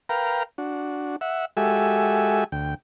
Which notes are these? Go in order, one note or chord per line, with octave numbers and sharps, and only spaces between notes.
A#4 B4 F5 G5 A#5
D4 F#4
E5 F#5
G#3 F#4 G4 A4 E5 G#5
D2 G5